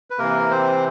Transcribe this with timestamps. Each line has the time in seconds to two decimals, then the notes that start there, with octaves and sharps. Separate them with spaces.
0.10 B4
0.18 C3 E3 A#3 A#4
0.51 C4 C5